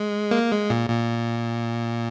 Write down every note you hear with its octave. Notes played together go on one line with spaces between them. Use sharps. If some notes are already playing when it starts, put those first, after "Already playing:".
Already playing: G#3
A#3
G#3
A#2
A#2